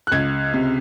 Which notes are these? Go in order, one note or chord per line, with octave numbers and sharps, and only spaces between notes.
F#6
C#2 G#6
C3